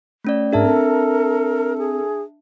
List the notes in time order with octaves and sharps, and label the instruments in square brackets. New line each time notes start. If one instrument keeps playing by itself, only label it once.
[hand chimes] A3 C#4 D5
[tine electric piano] G#2 G#4 [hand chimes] D4 E5 A5 [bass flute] A#4
[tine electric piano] C4 [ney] A4
[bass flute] G#4